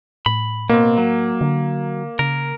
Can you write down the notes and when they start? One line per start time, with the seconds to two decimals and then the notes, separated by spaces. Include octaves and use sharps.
0.26 A2 B5
0.69 B2 A#3 C4
0.98 F#3
1.41 D3
2.19 C#3 A#4